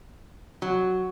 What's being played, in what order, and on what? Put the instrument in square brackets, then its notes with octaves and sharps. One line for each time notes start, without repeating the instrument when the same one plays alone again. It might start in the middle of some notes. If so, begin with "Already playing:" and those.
[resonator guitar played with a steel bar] F#3